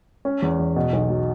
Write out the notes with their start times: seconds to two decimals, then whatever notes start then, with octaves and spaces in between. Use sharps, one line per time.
0.25 C#4
0.42 E2
0.59 E2
0.76 B2
0.93 B1
1.10 F#3